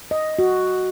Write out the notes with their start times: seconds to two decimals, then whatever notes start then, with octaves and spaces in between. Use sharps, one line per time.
0.11 D#5
0.39 F#4